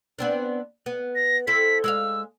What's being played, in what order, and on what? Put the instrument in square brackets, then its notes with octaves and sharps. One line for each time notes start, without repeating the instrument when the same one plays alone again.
[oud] B3 C4 D4
B3
[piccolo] A#6
[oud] C4 E4 A4 [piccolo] B6
[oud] G#3 E5 F5 [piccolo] E6